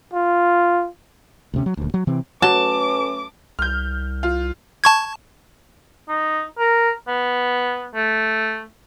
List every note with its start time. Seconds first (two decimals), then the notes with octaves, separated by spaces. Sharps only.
0.14 F4
1.54 D2 C3 C#4
1.66 F#3
1.77 D#1 D2
1.94 F#3
2.07 C3 E3 C4
2.42 F#3 A3 C#4 B4 A5 D6
3.59 C2 F6 G6
4.23 F4
4.84 A5 C#6 G#6
6.08 D#4
6.59 A#4
7.08 B3
7.95 A3